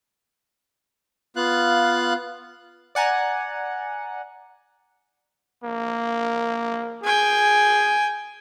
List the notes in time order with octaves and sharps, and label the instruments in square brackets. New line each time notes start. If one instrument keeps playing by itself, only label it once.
[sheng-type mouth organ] B3 F4 F5 F#6
[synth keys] D5 F#5 G#5 A#5
[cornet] A#3
[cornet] G#4 [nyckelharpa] G5 G#5